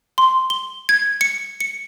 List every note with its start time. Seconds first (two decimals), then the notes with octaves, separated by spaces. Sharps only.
0.18 C6
0.50 G7
0.89 G#6
1.21 C#7
1.60 C#7